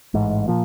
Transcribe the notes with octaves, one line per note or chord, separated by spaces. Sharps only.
A1 G#2
A#2 F3